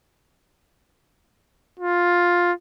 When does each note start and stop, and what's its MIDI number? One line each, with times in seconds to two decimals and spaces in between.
1.79 2.52 65